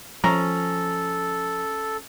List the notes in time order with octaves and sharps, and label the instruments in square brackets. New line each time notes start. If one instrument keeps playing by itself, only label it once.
[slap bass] F3 [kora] C#4 [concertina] A4 [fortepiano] A#5